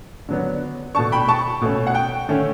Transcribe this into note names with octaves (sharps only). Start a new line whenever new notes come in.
D3 F#3 B3 D4
B2 A3 D4 A5 C#6
G5 B5
A5 C#6
B2 A3 C#4
F#5
G5
D3 A3 C#4